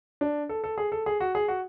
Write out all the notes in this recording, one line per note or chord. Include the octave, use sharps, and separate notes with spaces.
D4
A4
A4
G#4
A4
G#4
F#4
G#4
F#4